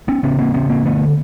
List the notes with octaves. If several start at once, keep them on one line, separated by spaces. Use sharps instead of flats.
B3 C#4
C#3 B3 C#4
A#3 C4
C#3 B3 C#4
A#3 C4
D3 A3 B3